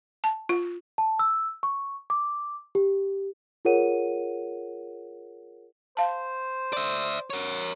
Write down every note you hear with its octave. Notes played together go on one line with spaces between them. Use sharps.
A5
F4
A5
E6
C#6
D6
G4
F4 G#4 A#4 C#5 F#5 D#7
C5 F5 A5
D5 E5
A#4 C#5